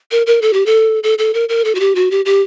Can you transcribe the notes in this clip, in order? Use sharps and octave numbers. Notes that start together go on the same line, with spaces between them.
A#4
A#4
A4
G4
A4
A4
A4
A#4
A#4
A4
F#4
G4
F#4
G4
G4